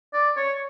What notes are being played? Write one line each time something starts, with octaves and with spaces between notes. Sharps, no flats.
D5
C#5